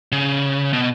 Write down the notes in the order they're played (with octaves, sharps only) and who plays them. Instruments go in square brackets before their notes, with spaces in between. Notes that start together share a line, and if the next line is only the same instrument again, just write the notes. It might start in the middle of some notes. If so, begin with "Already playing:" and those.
[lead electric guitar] C#3
B2